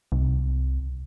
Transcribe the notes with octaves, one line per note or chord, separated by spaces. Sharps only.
C2